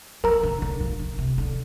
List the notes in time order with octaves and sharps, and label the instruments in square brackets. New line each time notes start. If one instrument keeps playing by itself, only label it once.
[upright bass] F3 [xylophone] A#4 A#5
[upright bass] D3
D3
F3
D3
C3
D3